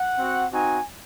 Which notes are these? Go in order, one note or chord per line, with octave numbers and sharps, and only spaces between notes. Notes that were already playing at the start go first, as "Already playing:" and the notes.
Already playing: F#5
C4 F#4
C4 D#4 F#4 G#5